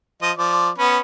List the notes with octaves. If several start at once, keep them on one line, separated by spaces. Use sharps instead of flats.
F3 D#5
F3 D5
B3 C#4 B4